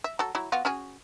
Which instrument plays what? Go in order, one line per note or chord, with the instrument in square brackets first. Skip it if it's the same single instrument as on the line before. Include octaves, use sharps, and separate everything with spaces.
[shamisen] E5
F#3 A4
F#3 E4
B3 F4 F#4
C#4 F#4 G#4